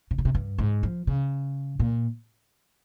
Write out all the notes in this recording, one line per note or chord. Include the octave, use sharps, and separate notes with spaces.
C3
C#3
C3
G2
G#2
F3
C#3
A#2